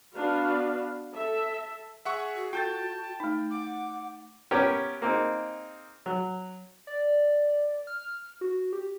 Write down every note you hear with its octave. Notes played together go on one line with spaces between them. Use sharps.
B3 D4 F#4 F5
A4 E5
G#4 E5 F#5 C#6
F#4
F4 A4 G5 A5 G6 A6
A3 D#4
F#5 D6
B3 C#4 G4 A#4 C#5
A#3 C4 D#4 G#4
F#3
D5
F6
F#4
G4